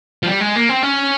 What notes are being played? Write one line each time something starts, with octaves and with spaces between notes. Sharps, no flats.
F3
G3
G#3
A#3
C4
C#4